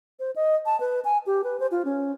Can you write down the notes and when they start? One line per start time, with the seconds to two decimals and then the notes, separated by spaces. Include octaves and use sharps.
0.20 C5
0.36 D#5
0.66 A5
0.80 B4
1.05 G#5
1.26 G4
1.44 B4
1.60 C5
1.71 F4
1.85 C#4